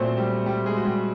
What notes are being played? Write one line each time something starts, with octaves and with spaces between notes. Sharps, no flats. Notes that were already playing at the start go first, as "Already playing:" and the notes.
Already playing: A#2 F#3 A3 C4 C5
G3 G4
G3 G4
G#3 G#4
F#4
G3 G4